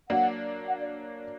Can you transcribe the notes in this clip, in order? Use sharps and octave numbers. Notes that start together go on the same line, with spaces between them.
F#3 A#3 D4 F#5
F#5
D5